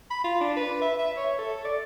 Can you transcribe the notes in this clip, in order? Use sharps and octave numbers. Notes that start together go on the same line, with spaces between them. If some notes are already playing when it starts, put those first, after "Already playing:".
B5
F4
D4
B4
E5
E5
C#5
A4
D5